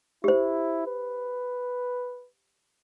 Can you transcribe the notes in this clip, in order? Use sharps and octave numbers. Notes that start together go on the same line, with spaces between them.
E4 G4 C5
B4